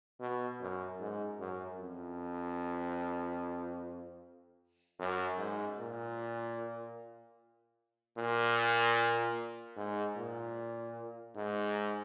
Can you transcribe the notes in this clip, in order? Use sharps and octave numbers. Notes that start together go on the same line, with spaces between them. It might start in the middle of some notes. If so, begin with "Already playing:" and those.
B2
F#2
G#2
F#2
F2
F#2
G#2
A#2
A#2
G#2
A#2
G#2